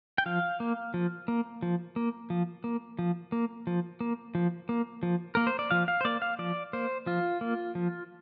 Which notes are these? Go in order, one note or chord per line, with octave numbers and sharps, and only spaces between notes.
G5
F3 F5
A#3
F3
A#3
F3
A#3
F3
A#3
F3
A#3
F3
A#3
F3
A#3
F3
A#3 A#4
C5
D5
F3 F5
F5
C5
A#3 D5
F5
F3 D5
A#3 C5
F3 F4
A#3
F3